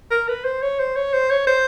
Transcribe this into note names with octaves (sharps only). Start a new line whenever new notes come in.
A#4
B4
C5
C#5
C5
C#5
C5
C#5
C5